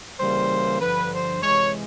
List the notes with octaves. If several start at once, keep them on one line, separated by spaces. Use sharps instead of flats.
C#3 E3 G3 A#3 C5
G2 D3 F3 B4
C5
C3 E3 G#3 C#5